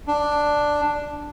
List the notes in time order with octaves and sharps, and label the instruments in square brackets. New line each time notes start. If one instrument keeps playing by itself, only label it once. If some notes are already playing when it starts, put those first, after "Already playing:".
[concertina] D4